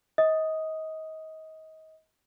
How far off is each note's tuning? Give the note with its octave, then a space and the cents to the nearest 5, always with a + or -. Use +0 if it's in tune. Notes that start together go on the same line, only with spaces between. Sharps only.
D#5 +30 D#6 +0